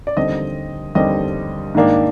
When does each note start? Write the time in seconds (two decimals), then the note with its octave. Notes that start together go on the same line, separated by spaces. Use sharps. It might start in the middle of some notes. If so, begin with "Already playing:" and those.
0.07 D5
0.16 D#2 D3 G3 C4 D#5
0.95 D#2 D3 G3 C4 D#5
1.75 G#2 D#3 A#3 D4